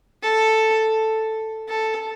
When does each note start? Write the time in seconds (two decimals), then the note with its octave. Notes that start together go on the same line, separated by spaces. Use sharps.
0.22 A4
1.69 A4